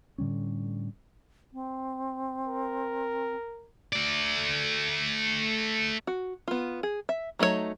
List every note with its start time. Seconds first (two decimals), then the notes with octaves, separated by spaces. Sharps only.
0.18 A2 D3 G3 C#4
1.53 C4
2.47 A#4
3.93 A3 D5
6.07 F#4
6.48 B3 F4
6.83 G#4
7.09 E5
7.39 F#3 A3 D#4 F4 C#5